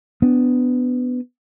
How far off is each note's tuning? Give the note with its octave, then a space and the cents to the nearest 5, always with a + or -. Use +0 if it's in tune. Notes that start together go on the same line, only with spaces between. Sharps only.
B3 +15 D4 +0